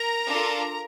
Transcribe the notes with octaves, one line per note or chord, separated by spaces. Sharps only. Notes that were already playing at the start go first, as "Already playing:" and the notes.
Already playing: A#4 A#5
D4 F4 A4